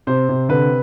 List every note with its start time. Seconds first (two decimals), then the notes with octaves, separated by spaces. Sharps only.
0.07 C3 C5
0.29 C3
0.49 D3 B4